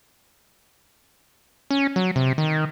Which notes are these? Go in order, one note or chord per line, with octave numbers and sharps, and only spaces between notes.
C#4
F#3
C3
D#3